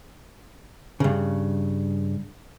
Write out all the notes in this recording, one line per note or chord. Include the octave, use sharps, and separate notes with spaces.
G2 C#3